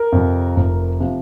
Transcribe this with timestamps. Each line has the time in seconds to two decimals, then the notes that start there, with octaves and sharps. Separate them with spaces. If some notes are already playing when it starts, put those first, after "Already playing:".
Already playing: A#4
0.12 F2 C3 F3
0.56 F1
1.00 C3 F3